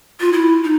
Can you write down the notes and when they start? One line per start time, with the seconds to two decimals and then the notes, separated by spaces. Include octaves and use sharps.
0.20 F4
0.33 E4
0.64 D#4